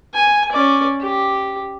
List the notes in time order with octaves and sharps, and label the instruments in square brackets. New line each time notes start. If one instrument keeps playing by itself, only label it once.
[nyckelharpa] G#5
C#4 D5
G4